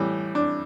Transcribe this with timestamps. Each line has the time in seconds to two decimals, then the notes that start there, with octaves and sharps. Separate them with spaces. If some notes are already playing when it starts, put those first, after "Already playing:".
Already playing: A2 E3 G3
0.35 D4